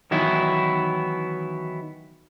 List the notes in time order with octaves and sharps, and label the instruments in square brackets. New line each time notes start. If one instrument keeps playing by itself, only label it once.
[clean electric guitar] D#3 E3 F#3 B3 E4